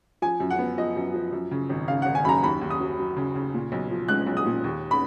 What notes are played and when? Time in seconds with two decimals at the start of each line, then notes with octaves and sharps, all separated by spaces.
0.22 F3 G#5
0.40 F#2
0.50 F#5
0.59 B3
0.77 F3 D#5
0.96 F#2
1.14 F3
1.32 F#2
1.51 C#3
1.69 G#1
1.88 C#3 F5
2.02 F#5
2.06 G#1
2.15 G#5
2.24 F#2 B5
2.29 A#5
2.43 D#2 B5
2.61 D#2
2.70 D#6
2.80 F#3
2.99 F#3
3.16 C#3
3.35 C#3
3.54 A#2
3.72 B1
3.90 F3
4.08 G#3 F#6
4.27 B1
4.37 D#6
4.46 A#2
4.64 D#2
4.91 B5